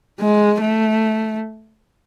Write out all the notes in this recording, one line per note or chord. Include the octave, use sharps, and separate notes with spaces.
G#3
A3